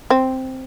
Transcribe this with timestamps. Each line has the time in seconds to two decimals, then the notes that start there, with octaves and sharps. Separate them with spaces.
0.10 C4